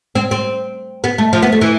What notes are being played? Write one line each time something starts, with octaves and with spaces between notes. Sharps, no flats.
C4
C4
B3
A3
F3
B3
A3
E3